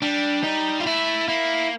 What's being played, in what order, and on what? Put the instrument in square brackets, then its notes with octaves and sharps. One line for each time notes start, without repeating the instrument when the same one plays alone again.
[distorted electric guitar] G3 [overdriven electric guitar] D4
[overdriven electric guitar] D#4
F4
[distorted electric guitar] A3 [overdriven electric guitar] E4
[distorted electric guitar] A#3 [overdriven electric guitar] E4